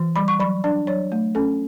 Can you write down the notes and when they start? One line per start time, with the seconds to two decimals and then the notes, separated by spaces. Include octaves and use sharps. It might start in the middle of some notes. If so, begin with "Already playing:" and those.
Already playing: E3
0.16 G3 B5
0.28 C#6
0.40 F#3 B5
0.64 D4 D5
0.87 F#3 C#5
1.12 A3
1.35 C#4 A4